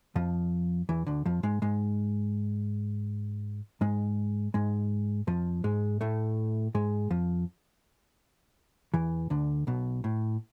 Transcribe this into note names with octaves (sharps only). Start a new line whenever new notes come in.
F2 F3
E2 E3
D2 D3
F2 F3
G#2 G#3
G#2 G#3
G#2 G#3
G#2 G#3
F2 F3
G#2 G#3
A2 A3
G#2 G#3
F2 F3
E2 E3
D2 D3
B1 B2
A2